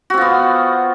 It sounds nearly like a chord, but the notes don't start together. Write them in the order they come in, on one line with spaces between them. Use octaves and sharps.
F#4 C4 F4 B3